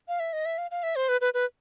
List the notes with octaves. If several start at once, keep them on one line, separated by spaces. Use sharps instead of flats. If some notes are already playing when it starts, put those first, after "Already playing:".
F5
E5
D#5
E5
F5
F5
E5
C5
B4
B4
B4